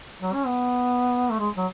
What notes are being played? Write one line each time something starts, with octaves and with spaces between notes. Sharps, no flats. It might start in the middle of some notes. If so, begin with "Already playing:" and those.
F#3
C#4
B3
A3
G#3
F#3